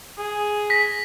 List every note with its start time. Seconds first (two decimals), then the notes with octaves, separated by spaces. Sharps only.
0.18 G#4
0.70 A#6 B6